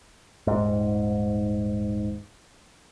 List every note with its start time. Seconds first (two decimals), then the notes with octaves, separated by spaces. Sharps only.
0.47 D#1 G#2